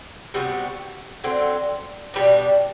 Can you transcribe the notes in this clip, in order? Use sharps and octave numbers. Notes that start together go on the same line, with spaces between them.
C3 G3 B3 F#4
D3 F#3 C4
B2 G3 D4